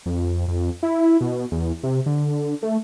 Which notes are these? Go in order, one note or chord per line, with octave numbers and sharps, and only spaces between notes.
F2
F2
E4
B2
E2
C3
D3
A3